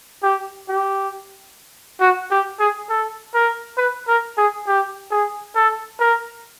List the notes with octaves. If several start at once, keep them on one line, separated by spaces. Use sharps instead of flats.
G4
G4
F#4
G4
G#4
A4
A#4
B4
A#4
G#4
G4
G#4
A4
A#4